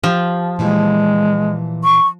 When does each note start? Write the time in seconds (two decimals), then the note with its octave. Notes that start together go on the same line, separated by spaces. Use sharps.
0.04 F3 G4
0.59 A#2 E3 G3 G#3
1.84 C#6